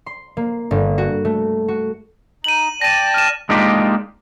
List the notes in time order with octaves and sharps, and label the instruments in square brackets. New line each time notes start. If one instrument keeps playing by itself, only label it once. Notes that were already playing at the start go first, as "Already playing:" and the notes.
[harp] C6
A#3
G1
F#4
A3
F#4
[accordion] D#4 [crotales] D#7 F#7
[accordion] D5 G5 A5 [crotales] A#6 D#7
[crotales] F6 E7
[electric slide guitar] G#3 A#3 D4 D#4 F4 G4